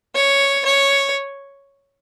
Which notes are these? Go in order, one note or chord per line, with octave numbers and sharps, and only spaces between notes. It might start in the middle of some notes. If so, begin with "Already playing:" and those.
C#5
C#5